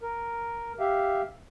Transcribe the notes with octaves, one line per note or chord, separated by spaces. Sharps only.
A#4
G4 E5 F5